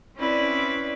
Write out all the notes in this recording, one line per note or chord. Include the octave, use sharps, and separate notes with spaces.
C4 C#4 E4 B4 D5